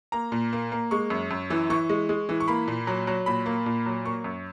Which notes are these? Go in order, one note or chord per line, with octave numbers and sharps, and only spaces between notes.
A#3 A#5
A#2
A#3
A#3
G#3 C#6
F#2
F#2
E3
E3 C#6
G#3
G#3
E3
C#6
A#3 B5
A#2
F#3
F#3
A#2 B5
A#3
A#2
F#3
A#3 C#6
F#2